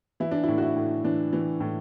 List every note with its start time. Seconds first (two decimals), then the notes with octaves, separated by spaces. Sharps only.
0.20 E3 E4
0.31 D4
0.44 A2 E4
0.58 F#4
0.62 E4
0.76 A2
1.04 E3 D4
1.33 E3
1.60 A2